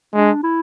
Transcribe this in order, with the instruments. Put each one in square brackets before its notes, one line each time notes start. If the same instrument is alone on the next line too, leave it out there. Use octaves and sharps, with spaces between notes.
[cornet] G#3 [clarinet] D4
[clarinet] E4